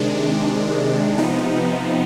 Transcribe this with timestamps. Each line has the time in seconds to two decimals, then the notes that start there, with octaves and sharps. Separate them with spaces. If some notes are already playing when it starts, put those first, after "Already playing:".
Already playing: C3 D#3 G#3 D4
1.18 C3 F3 B3 D#4